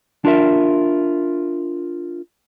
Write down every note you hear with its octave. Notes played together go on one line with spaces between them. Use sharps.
D4 F4 A#4 E5